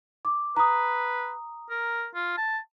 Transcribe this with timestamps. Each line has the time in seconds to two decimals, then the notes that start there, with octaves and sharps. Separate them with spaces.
0.25 D6
0.57 B4 A#5 D#6
1.70 A#4
2.15 F4
2.37 A5